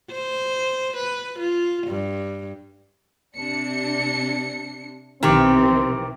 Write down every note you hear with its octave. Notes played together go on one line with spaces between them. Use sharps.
C5
B4
F4
G2
C3 D4 C#7
B1 C3 D#3 E3 C4 G4